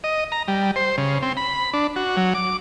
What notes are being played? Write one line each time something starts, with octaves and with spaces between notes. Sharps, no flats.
D#5
A#5
G3
C5
C#3
C4
B5
D4
F#4
F#3
D6